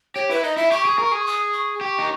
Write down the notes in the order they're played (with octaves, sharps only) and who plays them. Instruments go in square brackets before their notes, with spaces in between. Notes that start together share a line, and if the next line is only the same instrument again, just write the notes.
[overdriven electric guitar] G4 [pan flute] C#5
[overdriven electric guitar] E4 [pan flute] B4
[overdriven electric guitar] D#4 [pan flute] D#5
[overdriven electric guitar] E4 [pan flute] E5
[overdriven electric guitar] G4 [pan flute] C#6
[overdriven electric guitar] G#4
A#4
G#4
[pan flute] D#6
C#6
[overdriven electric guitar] G4
D#4